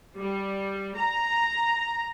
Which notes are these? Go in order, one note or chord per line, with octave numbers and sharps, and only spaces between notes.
G3
A#5